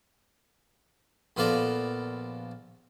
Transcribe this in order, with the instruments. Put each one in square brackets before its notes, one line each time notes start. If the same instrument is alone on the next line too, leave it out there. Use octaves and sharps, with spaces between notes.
[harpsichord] A#1 B3 F4 A4 D5 A#5